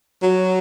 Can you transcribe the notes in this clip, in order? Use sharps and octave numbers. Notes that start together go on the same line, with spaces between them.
F#3